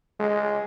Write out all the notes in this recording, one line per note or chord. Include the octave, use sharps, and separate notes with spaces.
G#3